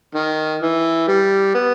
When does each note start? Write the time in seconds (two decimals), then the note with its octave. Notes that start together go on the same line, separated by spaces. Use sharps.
0.15 D#3
0.62 E3
1.08 G3
1.54 B3